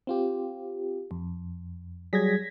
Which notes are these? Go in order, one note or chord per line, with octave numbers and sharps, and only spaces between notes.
C4 F4 G4
F2
F#3 G3 G#4 G#6 A#6 B6